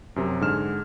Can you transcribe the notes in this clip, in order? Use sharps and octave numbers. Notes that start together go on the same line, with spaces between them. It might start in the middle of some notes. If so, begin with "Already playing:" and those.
F#2 C3 F#3
G#2 D3 G#4 F6 E7